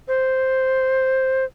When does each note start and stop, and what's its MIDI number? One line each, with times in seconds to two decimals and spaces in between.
0.08 1.44 72